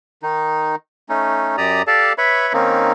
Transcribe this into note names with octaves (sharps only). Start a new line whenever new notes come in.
D#3 D#4
A3 C#4 D#4
F#2 G4 D5 A#5 D#6
G4 A4 D5 F5 A5
B4 C#5 E5 B5 C#6
D#3 A#3 C4 C#4 D#4